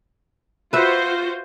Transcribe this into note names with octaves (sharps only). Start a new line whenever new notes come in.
F4 F#4 B4 C5 E5